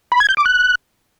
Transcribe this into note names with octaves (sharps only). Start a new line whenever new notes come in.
B5
G#6
G6
D6
F#6